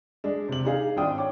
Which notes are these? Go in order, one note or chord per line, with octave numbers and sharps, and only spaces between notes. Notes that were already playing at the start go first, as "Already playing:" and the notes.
G#3 D4
C3 F#7
D4 D#4 G#4 F5
G#1 D4 F4 G5 D#6
C#5 G5 D6